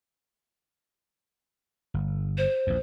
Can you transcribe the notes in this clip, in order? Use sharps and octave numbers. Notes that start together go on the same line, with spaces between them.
G1
C5
A#1 E2